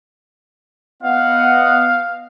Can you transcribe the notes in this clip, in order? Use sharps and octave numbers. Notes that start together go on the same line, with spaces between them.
B3 D#5 F5 F#5